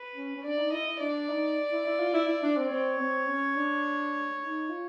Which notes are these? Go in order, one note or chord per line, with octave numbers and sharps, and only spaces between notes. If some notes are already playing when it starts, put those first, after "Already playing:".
Already playing: B4
C#4
C#4
D4 D5
D#4
E4 D#5
E4
D4 D5
D#4
E4
E4
F4
E4
E4
D4
C4
C4 C#5
C4
C#4
D4
D#4
F4